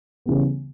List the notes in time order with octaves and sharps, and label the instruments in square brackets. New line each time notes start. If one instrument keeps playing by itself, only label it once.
[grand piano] C#3 E3 G3 B3